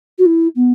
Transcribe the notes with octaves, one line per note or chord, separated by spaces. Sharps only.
F#4
E4
B3